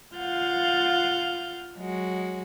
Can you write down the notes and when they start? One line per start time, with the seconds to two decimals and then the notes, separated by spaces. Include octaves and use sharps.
0.15 F4 F5 F#5 F6 G6 A6
1.77 F#3 G#3 F#4